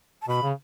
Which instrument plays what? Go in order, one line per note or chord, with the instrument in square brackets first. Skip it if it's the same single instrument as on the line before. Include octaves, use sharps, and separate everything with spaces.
[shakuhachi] A5
[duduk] B2 [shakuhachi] B5
[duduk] C#3